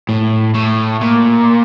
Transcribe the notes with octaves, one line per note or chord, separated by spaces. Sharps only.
A2
A2
A#2